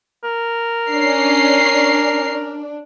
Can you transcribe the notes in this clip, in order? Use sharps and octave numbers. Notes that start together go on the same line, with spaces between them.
A#4
C#4 D4 C7